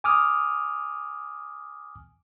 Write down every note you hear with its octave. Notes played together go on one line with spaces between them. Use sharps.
G#5 D6 D#6 F6